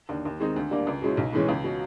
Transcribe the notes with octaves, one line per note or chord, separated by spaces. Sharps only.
D#2 D3
D#2
D#3 G#3 C4 D#4
D2
D3 G3 A#3 D4
C#2
B2 G#3 C#4 E4
B1
A2 E3 G#3 C#4
C#2
B2 F#3